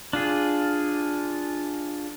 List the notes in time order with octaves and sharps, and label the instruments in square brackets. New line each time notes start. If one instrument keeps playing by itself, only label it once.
[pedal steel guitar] D4 F4 G#4